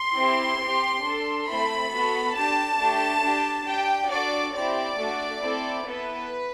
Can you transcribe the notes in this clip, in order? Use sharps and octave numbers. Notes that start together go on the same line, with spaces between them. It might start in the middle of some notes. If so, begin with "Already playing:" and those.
Already playing: C6
C4 E4 G4
C4 G4
D4 A4
A3 C4 E4 A4 B5
B3 F#4 A4
D4 G4 A5
A3 D4 G4
D4 G4
D4 G4 G5
D4 F#4 A4 D5
C4 E4 G4 D5
A3 D4 F#4
C4 E4 A4
B3 E4 A4 B4